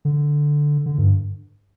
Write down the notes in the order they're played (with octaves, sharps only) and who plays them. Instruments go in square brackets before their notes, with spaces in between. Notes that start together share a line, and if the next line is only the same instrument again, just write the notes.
[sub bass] D3
D3
G2